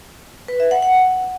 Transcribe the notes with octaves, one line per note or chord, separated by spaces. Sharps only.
B4
E5
F#5
F#5